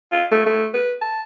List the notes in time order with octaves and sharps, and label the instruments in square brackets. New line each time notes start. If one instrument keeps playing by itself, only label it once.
[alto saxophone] F4
A3
A3
B4
A5